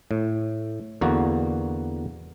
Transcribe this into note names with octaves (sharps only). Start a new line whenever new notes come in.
A2
E2 D3 A#3 F#4